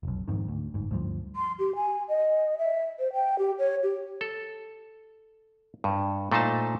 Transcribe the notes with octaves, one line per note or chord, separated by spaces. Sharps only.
F1 B1
F2 G#2 C3 D#3
D2
G1 G#2
D2 G2 A#2 F3
C6
G4
G#5
D#5
E5
C5
G5
G4
C#5
G4
A4
G2
A#2 A3 D#4 C5 A5